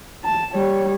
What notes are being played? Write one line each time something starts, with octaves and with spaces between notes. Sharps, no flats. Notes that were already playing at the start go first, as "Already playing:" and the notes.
A5
G3 C#5